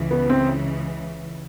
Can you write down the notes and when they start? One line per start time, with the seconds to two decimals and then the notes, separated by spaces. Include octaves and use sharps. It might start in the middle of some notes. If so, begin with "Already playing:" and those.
Already playing: C#2 C#3 E3
0.11 B3
0.30 C4